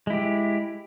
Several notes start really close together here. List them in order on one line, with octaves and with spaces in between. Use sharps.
G#3 E4 G4